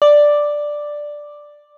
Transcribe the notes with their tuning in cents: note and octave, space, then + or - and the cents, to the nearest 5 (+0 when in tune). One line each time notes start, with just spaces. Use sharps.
D5 +5